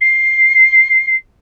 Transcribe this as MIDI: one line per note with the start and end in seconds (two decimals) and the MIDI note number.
0.01 1.16 96